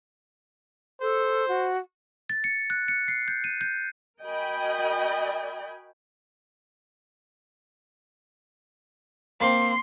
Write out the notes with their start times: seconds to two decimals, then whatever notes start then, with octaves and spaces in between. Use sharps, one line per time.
1.01 A4 C5
1.48 F#4
2.30 A6
2.44 C#7
2.70 F#6
2.88 C#7
3.08 C7
3.28 G6
3.44 D#7
3.61 G6
4.22 F#4 A#4 D#5 G5 G#5 B5
9.41 A#3 C4 C6